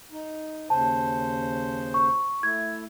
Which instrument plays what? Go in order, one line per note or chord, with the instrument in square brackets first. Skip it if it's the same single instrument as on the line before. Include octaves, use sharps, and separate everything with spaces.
[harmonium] D#4
[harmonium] D#2 C#3 C5 [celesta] A5
[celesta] C#6
[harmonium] A3 E4 [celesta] G#6